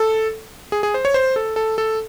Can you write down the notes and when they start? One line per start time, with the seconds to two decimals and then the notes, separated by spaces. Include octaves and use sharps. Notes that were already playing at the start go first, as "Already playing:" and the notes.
Already playing: A4
0.72 G#4
0.83 G#4
0.94 C5
1.05 C#5
1.14 C5
1.36 A4
1.56 A4
1.78 A4